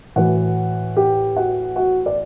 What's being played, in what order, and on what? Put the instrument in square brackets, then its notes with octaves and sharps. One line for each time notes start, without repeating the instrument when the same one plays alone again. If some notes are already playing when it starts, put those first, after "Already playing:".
[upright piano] A2 E3 F#4 F#5
G4 G5
F#4 F#5
F#4 F#5
D5